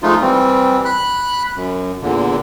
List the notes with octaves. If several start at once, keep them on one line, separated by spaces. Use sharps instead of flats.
F3 G#3 A3 D#4 F4
E3 G3 C4
B5 F#6
F#2
E2 A#2 D3